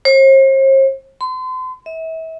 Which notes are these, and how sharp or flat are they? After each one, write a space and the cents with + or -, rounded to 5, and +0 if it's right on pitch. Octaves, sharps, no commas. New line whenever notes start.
C5 +45
C6 -40
E5 -35